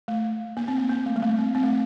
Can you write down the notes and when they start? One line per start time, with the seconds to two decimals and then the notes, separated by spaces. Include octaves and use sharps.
0.08 A3
0.57 A#3
0.68 C4
0.78 A#3
0.89 A#3
1.06 A3
1.16 G3
1.23 A3
1.38 C4
1.55 C4
1.63 A3